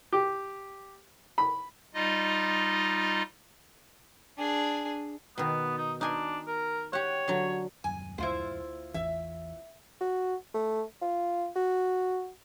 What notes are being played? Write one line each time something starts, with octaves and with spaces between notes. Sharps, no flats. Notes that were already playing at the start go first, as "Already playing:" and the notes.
G4
B5
G3 D#4 F4 D#5
D4 G#4
B2 D#3 B3
D#4
D4 D#4 G#5 C6
A#4
G4 C#5 F#5
D3 F#3
D#1 F#2 G#5
D2 E4 F4 C5
A1 E2 E5
F#4
A3
F4
F#4